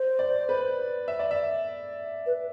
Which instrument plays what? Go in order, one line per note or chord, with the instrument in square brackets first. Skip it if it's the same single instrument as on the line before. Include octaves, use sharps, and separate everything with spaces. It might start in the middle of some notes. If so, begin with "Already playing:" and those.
Already playing: [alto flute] C5
[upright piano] D5
B4
E5
D5
E5
[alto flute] B4